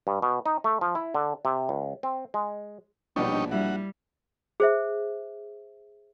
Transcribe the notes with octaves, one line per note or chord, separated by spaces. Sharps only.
G2
B2
D#4
A3
F3
E4
D3
C3
C#2
C4
G#3
A#1 B2 G3 D4 D#4 C#5
G3 E4 F#4
G#4 C5 E5